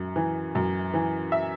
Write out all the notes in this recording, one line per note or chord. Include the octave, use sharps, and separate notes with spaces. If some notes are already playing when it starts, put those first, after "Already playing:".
Already playing: F#2
E3
F#2
E3
E5